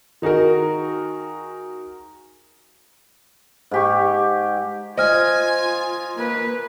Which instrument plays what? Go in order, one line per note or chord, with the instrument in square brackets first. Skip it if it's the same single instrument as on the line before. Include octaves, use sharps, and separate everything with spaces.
[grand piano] D#3 D#4 F#4 G#4 A#4
[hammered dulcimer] G#2 G4 C#6
[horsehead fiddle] F4 [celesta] C5 F6 [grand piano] D#5 [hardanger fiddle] G#5
[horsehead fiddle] A#3 B4